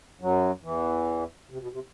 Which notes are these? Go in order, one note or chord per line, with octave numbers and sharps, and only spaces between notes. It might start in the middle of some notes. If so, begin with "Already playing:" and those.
F#2 F#3
E2 E3
C3
B2
C3